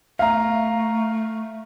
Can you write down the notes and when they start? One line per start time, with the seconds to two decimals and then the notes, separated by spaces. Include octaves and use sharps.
0.19 A3 F5 A#5